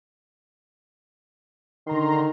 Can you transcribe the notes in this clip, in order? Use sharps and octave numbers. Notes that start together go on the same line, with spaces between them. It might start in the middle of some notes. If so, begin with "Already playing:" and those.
D3 D#3 A#5 C6